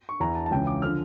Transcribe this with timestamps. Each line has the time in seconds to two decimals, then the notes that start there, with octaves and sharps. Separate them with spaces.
0.09 C#6
0.20 E2 E3 A#5
0.35 A5
0.46 A5
0.51 C#2 C#3 E3 G5
0.67 D6
0.82 D3 F3 F6